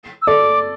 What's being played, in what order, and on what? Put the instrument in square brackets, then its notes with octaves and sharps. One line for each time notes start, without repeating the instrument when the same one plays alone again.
[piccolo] E6
[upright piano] A4 D5 [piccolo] D6